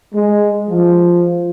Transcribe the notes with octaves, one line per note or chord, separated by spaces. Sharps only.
G#3
F3